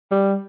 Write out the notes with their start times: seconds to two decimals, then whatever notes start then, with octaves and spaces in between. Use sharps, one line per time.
0.11 G3